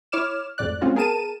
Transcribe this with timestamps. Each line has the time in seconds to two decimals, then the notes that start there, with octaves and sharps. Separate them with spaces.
0.12 E4 C#5 D6 F6 E7
0.58 G#1 F2 A2 D5 F#6
0.81 G#3 C4 C#4 F4 F#4
0.95 B3 G#4 A#4 A5 D#7 E7